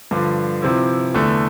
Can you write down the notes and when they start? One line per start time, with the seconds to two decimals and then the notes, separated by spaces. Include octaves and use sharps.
0.11 G2 D3 F3
0.62 C3 F3 C4 E4
1.14 E2 D3 A3